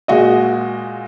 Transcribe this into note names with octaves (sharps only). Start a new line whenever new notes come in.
A#2 G#3 F#4 D#5